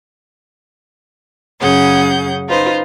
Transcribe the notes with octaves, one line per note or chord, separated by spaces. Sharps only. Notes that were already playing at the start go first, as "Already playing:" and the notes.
F#2 C#3 G#4 F#5 G6
D#4 F4 B4 C5